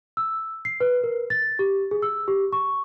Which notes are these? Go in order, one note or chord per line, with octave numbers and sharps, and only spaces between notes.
E6
C7
B4
A#4
A6
G4
G#4
E6
G4
C#6